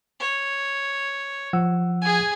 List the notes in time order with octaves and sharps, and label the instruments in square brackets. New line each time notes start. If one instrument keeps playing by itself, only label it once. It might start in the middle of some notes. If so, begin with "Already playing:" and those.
[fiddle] C#5
[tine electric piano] F3 F#5 E6
[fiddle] G#4 G#5